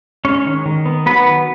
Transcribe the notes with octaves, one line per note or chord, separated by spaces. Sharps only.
G#3 C#4 C#5
D#3
D#3
B3
F#3 B3 B4
D#3